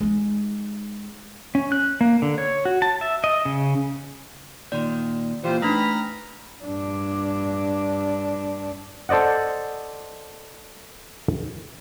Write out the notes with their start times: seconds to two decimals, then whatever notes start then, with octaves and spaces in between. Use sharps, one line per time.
0.01 G#3 D#4
1.55 C#4
1.72 F#6
2.01 A#3
2.22 D3
2.38 C#5
2.65 F#4
2.82 A5
3.01 E5
3.24 D#5
3.45 C#3
4.72 A#2 D#3 D5 C6
5.44 A#2 E3 F4 G4 C5
5.62 A3 D4 D#4 B4 A#5 B5 F6
6.64 G2 D4
9.09 A4 C5 D5 D#5 F#5